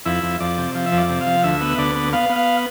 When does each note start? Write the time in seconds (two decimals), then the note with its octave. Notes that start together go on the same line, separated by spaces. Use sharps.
0.05 F2 E4
0.23 F2
0.40 F2 D5
0.58 C3
0.75 F3
0.86 E5
0.92 F2
0.98 D5
1.09 C3
1.21 F5
1.27 F3
1.43 D2 E5
1.61 B3
1.78 D2 D5
1.95 B3
2.13 B3 F5
2.29 B3
2.36 F5